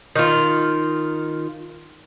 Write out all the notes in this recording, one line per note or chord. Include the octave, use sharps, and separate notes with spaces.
D#3 F4